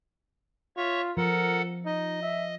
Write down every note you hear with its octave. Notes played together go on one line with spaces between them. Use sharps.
F4 C#5 E5 C#6
F3 A4 A#4 F#5
D#4 D#5
E5